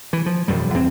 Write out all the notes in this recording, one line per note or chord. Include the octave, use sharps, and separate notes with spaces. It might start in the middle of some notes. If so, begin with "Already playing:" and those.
E3
F3
E1 F#2 G3
E2 C4